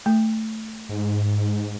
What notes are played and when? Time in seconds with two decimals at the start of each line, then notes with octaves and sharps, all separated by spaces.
0.06 A3
0.89 G#2